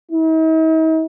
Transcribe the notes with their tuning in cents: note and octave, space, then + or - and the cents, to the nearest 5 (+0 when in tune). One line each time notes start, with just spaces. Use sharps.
D#4 +45